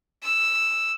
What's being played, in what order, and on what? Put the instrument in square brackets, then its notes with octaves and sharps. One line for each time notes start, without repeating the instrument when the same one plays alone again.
[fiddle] E6